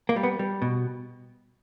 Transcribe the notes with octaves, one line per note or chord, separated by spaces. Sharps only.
A#3
G3
B3
G3
B2